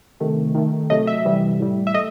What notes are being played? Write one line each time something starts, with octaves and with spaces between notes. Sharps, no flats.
C3 D#3 A3
D#3 A3
C3 F#3 A3 D#5
E5
C3 E3 G3
A2 G3
E5
A3 D#5